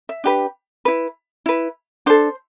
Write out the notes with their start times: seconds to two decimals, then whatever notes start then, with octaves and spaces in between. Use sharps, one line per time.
0.09 E5
0.24 D4 G4 B4
0.85 E4 B4
1.46 E4 B4
2.06 D4 A4 C5